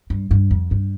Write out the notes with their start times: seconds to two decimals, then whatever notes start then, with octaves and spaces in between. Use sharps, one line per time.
0.10 G2
0.31 G2
0.51 F2
0.71 G2